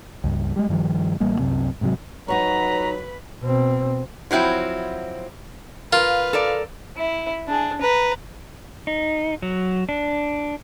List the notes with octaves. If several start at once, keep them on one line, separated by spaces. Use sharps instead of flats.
C#2 G2
G3 G#3
G2 D#3 F3 G3
A1 G3 A#3
C2 F#2 C3
G#2 C3 F#3
F2 F#3 D#4 F#4 B4 C#5 A#5 B5
B2 C4
F3 F#3 C4 E4
F4 A#4 B4 F5
A4 A#4 D5
E4
D4 G#4
B4 A#5
D#4
F#3
D4